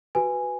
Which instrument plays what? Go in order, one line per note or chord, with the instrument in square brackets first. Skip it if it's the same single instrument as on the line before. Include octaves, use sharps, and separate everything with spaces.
[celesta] F#4 B4 G#5